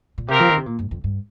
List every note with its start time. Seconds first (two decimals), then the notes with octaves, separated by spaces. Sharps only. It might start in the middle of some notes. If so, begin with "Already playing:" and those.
0.18 A#2
0.28 C3 C4 G4 A#4 F5
0.40 F3
0.49 D#3
0.57 C3
0.66 A#2
0.79 G2
0.91 F2
1.04 G2